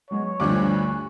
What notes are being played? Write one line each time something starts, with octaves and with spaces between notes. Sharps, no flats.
F#3 G#3 B3 C#5
D2 G2 F3 G3 G4 G#5 D6 F#6